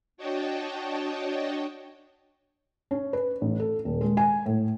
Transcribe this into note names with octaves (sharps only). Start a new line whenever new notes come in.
D4 F#4 C#5 D#5 G5 A5
C#4
B4
A1
A4
D#1
G#3
G#5
A2